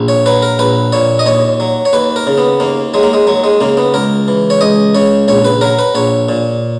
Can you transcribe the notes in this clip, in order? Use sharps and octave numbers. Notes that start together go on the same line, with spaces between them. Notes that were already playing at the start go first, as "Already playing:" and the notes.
Already playing: A#1
C#5
F#3 B4
A#4
A#1 B4
A#2 C#5
D#5
D#2 C#5
F#3
C#5
D#2 B4
A#4
C#3
B3
D#2 A#3
F#3 G#3
A#3
G#3
D#2 F#3
G#3
C#3 A#3
B3
C#2 A#4
E3
C#5
C#2 D#5
C#3 C#5
A#1 C#5
B4
F#3 A#4
B4
A#1 C#5
A#2